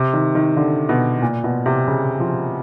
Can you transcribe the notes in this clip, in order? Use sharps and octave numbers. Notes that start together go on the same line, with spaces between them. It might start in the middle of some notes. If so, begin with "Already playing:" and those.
Already playing: C3
D#3
D#3
D3
B2
A#2
B2
C3
C#3
F3